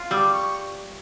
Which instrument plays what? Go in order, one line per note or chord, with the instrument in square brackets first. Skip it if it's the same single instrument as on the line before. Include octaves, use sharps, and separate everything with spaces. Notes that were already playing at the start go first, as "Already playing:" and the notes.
Already playing: [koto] F4
[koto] G3 [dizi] E6
[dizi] D6
C#6